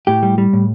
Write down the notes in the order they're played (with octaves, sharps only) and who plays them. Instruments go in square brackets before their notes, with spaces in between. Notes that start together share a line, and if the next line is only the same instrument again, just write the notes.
[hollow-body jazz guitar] A2 G4
G3
G3
A2